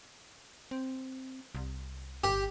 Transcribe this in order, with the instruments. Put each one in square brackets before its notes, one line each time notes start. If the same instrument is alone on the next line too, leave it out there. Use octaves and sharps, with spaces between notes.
[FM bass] C4
C2
[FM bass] G1 [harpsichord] G4